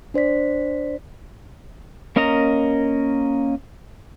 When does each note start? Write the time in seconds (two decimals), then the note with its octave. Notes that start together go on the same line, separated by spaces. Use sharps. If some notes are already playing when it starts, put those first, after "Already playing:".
0.14 D4 C5 D5 B6
2.16 A#3 C#4 A#4 D#5 A#5